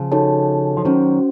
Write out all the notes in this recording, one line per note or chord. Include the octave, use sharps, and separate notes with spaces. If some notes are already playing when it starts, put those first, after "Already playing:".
Already playing: C#3 F3
D#4 F#4 A4 C#5 A5
F3
D#3 F#3 C#4 F#4 C5